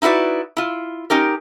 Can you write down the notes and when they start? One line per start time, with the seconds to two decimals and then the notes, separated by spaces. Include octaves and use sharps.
0.02 D#4 E4 F#4 B4 D5
0.57 E4 F4
1.10 C#4 D#4 G4 A#4